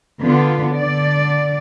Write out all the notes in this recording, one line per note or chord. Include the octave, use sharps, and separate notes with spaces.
D3 B3 F4
D3 D5